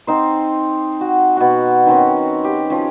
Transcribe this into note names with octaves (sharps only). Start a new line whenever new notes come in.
C4 D#4 C5
F#4
B2 F#4
D#3 C4 C#4
G4
F3 C#4